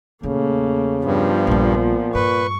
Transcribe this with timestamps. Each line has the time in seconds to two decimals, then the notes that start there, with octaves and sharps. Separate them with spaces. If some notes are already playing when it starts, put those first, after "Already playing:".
0.23 E2 A#2 C#3 A3 A#3
1.05 G2 F3 B3
1.47 A#1 A#2 G3
2.15 G2 B4 C#6